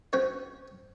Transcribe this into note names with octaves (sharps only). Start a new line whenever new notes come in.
C4 C#4 F#4 C5 C#5